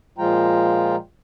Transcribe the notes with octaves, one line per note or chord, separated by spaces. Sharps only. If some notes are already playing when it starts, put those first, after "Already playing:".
A#2 F3 G#3 F4 G5 A#5